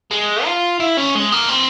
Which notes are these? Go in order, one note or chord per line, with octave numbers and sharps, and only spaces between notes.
G#3
F4
E4
C#4
G#3
A#3
C4